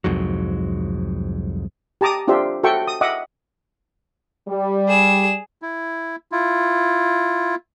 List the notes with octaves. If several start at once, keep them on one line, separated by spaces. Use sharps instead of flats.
C2 F2 G#2 F#3
G4 A5 A#5 D6 D#6
D4 F4 G4 C5 E5
F#4 A4 E5 G5 C#6
D#6
D#5 E5 F#5 D6 D#6
G3
G#4 E7
E4
E4 F4